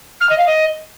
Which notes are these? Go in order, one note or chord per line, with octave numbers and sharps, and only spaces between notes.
F6
D#5
F5
D#5